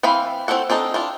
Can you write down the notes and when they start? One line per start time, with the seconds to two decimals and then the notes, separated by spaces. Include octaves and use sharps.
0.03 E3 C4 F5 B5
0.48 A3 C4 E4 A4 F#5
0.70 C4 D4 D#4 A4
0.94 D4 E4 F4